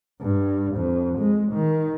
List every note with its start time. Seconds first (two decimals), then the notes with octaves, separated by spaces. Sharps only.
0.21 G2
0.75 F2
1.18 G#3
1.52 D#3